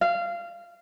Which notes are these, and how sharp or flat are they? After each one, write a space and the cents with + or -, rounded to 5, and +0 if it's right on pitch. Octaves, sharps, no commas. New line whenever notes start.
F5 -20